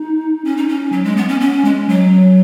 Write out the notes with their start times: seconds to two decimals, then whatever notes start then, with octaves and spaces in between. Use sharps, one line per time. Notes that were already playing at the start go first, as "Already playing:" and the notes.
Already playing: D#4
0.45 C#4
0.57 D#4
0.69 C#4
0.92 F#3
1.04 G#3
1.17 B3
1.28 C#4
1.41 C#4
1.65 G#3
1.89 F#3